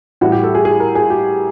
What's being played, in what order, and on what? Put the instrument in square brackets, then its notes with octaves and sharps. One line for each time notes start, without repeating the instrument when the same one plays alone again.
[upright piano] A2 E3 G3 F#4
G4
A4
G#4
G#4
A#4
G#4
G4